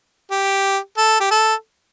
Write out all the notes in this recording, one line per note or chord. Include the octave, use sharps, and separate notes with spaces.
G4
A4
G4
A4